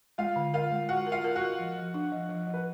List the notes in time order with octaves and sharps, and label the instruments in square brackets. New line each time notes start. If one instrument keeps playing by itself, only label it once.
[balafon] G#3 [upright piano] F4 F5
[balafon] D3
[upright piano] F4 F5 [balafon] A#4
[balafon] G#3
[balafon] G#3 [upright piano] F#4 F#5
[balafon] A#4
[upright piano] F4 F5
[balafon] A#4
[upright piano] F#4 F#5
[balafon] A#4
F3
F3
D4
F3
F3
F3
[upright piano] B4